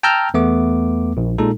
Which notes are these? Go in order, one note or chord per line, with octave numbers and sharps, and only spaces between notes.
G5 A5 A#5 E6 F6 G6
E2 A3 B3 D6
A#1
A#2 G#3 D#4 A4